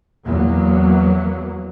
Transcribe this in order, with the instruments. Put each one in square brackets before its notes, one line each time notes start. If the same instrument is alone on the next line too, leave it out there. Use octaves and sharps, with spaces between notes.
[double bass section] E2 F#3 A#3 B3